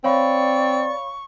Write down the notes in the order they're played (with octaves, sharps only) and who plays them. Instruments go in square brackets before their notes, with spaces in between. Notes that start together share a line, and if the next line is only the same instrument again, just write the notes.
[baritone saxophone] C4 [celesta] C#5 F5 B5 [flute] D5 [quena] C#6